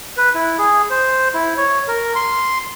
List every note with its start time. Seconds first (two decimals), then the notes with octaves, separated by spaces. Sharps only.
0.17 B4
0.34 E4
0.58 G#4
0.90 C5
1.34 E4
1.57 C#5
1.88 A#4
2.15 C6